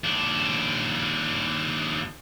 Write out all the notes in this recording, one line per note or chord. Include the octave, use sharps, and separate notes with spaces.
D#2 D4